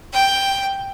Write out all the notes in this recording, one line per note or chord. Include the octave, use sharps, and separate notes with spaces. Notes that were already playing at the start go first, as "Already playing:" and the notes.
G5